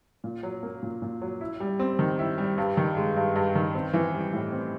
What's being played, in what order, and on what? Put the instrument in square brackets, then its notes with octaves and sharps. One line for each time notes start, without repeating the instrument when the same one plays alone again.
[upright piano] A#2
F#3
A#3
A#2
A#2
F#3
E4
G3
C4
D#3
E4
G3
G2
D#3
G#3
G2
G2
D#3
C4
E3
G3
A2
C4